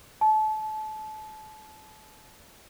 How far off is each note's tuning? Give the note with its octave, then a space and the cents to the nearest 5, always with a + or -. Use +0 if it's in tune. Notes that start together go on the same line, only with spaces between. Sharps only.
A5 -30